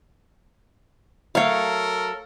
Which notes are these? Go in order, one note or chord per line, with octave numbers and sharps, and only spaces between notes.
F#3 A3 A4 A#4 C#5 F5